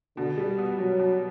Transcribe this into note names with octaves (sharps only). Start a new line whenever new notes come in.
B2 D3
G3
B3
B2 F#3
B2